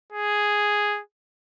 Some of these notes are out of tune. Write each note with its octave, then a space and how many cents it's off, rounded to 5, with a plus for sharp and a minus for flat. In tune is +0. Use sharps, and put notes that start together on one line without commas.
G#4 +0